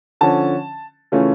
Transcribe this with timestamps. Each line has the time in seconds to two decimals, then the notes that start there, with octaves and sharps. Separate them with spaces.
0.21 D3 F3 C#4 A5
1.12 C#3 E3 A3 C#4 F4